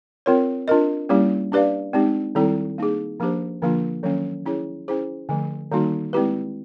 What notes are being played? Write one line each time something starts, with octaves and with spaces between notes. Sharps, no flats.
C4 F4 A#4 C#5
D4 F4 A#4 D#5
G3 A#3 C#4 E4 G4
D4 G4 B4 D5 F5
G#3 C4 D#4 G4
D#3 G3 C4 E4 A4
A#3 D#4 G#4
F3 A#3 D4 G4 C5
D3 F3 A#3 D4 F4
D#3 F#3 A#3 C#4
C#4 E4 G#4 C#5
C#4 E4 G#4 C5
D3 F3 A3
D#3 G3 A#3 D#4 F#4
G#3 C4 E4 G4 B4